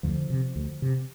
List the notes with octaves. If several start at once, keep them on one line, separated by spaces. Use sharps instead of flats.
D2 D3 F3
C3
D2
C3